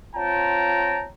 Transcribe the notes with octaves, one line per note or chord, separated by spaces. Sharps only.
C4 F4 C#5 G5 A5 A#5